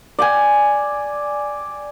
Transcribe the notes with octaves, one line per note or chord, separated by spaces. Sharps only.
D5 G5 G#5